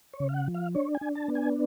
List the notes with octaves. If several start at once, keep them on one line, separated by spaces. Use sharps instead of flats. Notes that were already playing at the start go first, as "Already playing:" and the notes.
C#5
C#3
F5
F#5
F3
F5
D4 C#5
G#5
D4
A5
B3
G#5